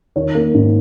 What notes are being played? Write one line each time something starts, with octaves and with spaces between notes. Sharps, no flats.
D#3 C#5
A#3
G#2